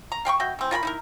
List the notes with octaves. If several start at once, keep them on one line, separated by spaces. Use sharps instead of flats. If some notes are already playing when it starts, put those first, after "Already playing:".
A#5
F5 G5 B5 C#6
B2 F#4 E5 G5
E3 C4
F4 A#4 G5 B5
D#4 E4 A#4